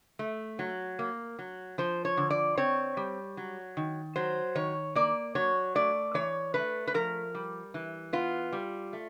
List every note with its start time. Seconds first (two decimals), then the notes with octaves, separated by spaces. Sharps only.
0.19 A3
0.59 F#3
0.99 A#3
1.39 F#3
1.78 F3 C5
2.05 C#5
2.17 D3
2.31 D5
2.57 C4 C#5
2.97 G3
3.37 F#3
3.77 D#3
4.16 F#3 C5
4.55 D#3 C#5
4.95 A#3 D5
5.35 F#3 C#5
5.75 A3 D5
6.14 E3 C#5
6.54 A3 B4
6.87 B4
6.94 F3 A#4
7.35 G3
7.74 E3
8.13 B3 F4
8.52 G3
8.93 A3